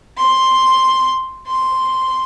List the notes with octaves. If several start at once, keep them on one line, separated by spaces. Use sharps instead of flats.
C6
C6